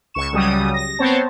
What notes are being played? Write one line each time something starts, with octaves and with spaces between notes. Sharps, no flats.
C#2 C#6 E7
C#2 C#3 F#3 G3 D#6
A#6
B3 C4 C5 C#5 A5